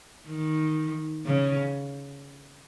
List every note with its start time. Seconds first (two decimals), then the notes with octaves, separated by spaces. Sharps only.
0.27 D#3
1.26 C#3